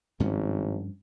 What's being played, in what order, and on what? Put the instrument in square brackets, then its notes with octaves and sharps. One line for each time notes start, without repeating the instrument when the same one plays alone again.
[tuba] G#1 [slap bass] G2 F3 C#4